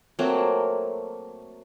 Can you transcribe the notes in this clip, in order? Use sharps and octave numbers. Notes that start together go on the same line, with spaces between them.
F#3 A3 A#3 C4